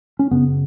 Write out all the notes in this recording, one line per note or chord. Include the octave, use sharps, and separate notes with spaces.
C#4
F#2 C#3 B3